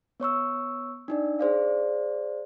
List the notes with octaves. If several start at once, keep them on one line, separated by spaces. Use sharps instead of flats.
B3 C#5 C#6 E6
D4 D#4 D5
G#4 C5 D5 F5